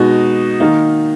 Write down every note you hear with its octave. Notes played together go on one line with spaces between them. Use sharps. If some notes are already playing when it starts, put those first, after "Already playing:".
Already playing: B2 G#3 D#4 F#4
D#3 A#3 D#4